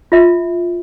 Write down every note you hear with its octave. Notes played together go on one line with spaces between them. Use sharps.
F4 E5